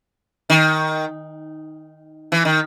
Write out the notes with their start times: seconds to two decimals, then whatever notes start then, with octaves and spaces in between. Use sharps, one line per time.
0.50 D#3
2.32 E3
2.45 D#3